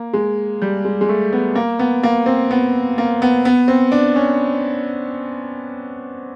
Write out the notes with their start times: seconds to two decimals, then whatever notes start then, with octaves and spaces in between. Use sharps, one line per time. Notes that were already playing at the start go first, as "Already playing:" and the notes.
Already playing: A#3
0.13 G#3
0.62 G3
0.85 G#3
1.01 G#3
1.09 A3
1.33 B3
1.55 A#3
1.79 B3
2.03 A#3
2.26 C4
2.51 B3
2.98 A#3
3.22 B3
3.45 B3
3.68 C4
3.92 D4
4.16 C#4